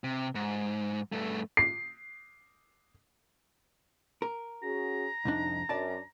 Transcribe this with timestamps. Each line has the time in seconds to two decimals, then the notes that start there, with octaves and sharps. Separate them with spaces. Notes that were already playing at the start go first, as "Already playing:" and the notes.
0.04 C3
0.35 G#2
1.12 G2 A3
1.57 C7
4.22 A#4
4.63 C#4 F#4 G#4 A#5
5.25 C2 F2 D4 D#4
5.69 F#2 D4 D5 A5